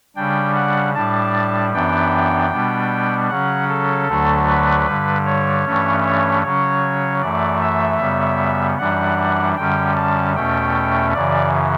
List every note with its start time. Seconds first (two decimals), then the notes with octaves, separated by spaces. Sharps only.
0.16 C#3 G3 D4 G5
0.55 F#5
0.94 A2 G3 D4 A5
1.73 F#2 E3 B3 D4 G5
2.51 B2 G3 B3 D4
3.29 C#3 F#3 C#4 F#5
3.69 A4
4.08 D2 D3 F#3 A3 D4
4.47 B4
4.86 G2 D3 G3
5.25 C#5
5.65 G2 E3 A3 C#4
6.04 C#5
6.43 C#3 F#3 C#4 C#5
7.21 F#2 E3 A3 D5
7.61 E5
8.00 F#2 C#3 G3 B3
8.78 F#2 E3 G3 D4 F#5
9.57 F#2 D3 G3 C#4 G5
9.96 A5
10.35 E2 B2 A3 C#4 G5
11.13 F#2 C#3 E3 D5